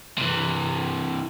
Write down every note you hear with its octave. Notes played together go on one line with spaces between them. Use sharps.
C3 E3